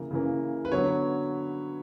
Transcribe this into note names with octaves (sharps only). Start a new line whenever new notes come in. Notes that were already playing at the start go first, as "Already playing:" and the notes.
Already playing: C#3 E3 A#3
C#3 E3 A#3
B4
D3 F#3 B3 C#5